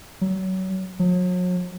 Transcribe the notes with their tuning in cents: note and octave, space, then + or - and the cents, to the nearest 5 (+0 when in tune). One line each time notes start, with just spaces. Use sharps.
F#3 +25
F#3 -40